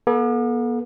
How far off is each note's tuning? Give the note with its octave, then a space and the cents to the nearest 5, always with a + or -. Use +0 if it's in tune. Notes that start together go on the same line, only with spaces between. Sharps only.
B3 -45 A4 -25